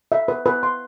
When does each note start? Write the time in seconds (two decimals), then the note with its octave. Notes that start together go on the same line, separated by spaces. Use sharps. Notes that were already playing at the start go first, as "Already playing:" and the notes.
0.12 E5
0.28 B4
0.46 B4
0.63 C6